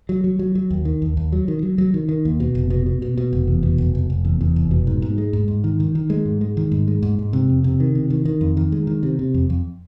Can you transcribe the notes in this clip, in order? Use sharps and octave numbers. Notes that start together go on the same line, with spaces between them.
F#3
F#3
F#3
F#3
D#2
D#3
D#2
D#2
F#3
D#3
F#3
F#3
D#3
D#3
D#2
B2
F1
B2
B2
B2
B2
F1
E2
B2
F1
F1
F1
E2
E2
F1
B2
G#2
G#2
G#3
G#2
G#2
D#3
D#3
D#3
G#3
G#2
G#3
D#3
G#2
G#3
G#2
G#2
C3
F2
C3
D#3
C3
D#3
D#3
F2
D#3
G#3
D#3
C3
C3
F2
F2